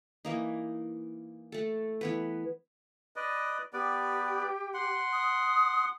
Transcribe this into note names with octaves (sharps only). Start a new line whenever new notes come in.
E3 A#3 D#4
A3 A4
E3 B3 B4
B4 D5 D#5
B3 G4 B4 D5
F#5 C6
D#6